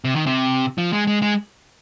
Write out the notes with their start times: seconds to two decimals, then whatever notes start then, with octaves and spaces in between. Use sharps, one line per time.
0.04 C3
0.16 D#3
0.26 C3
0.78 F3
0.93 G#3
1.07 G#3
1.22 G#3